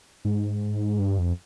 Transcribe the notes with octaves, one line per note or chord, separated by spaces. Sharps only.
G#2
G2
F2